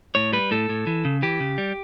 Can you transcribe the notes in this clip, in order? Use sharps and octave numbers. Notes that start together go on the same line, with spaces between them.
A2 C#5
G3 B4
A2 A4
A2
E3
C#3
E3 G4
C#3
G3